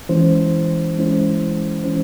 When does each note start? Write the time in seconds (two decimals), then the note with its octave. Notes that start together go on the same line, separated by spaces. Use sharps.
0.09 E3 G#3 C#4 E4 C5
0.96 E3 G#3 C#4 E4 C5
1.84 E3 G#3 C#4 E4 C5